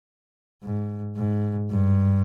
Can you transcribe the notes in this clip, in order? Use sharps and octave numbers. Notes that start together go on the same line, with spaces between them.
G#2
G#2
G2